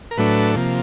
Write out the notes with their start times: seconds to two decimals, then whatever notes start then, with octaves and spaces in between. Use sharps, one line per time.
0.11 A#4
0.17 A2 F#3 A3 D4 B4
0.55 C3 F3 A#3